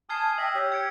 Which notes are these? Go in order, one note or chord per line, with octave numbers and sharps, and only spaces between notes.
G#5 A5 D#6 F6 G#6 C7
D#5 E5 G5 E6
G4 C#5
G#6 C#7 D7